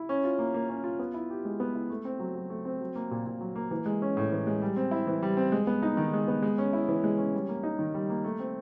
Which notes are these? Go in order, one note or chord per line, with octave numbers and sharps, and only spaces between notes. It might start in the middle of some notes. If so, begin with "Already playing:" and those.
Already playing: E4
C#4
F4
A#3
A#3
C#4
F4
B3
E4
G4
G#3
B3
E4
A3
C4
F#3
F#3
A3
C4
F#3
A#3
A#2
A#2
F#3
A#3
E3
G#3
C#4
A2
E3
G#3
G3
C4
E4
E3
G3
C4
G#3
B3
D#4
D#3
G#3
B3
G#3
C#4
E4
E3
G#3
C#4
G3
A#3
D#4
D#3
G3
A#3
A3
C4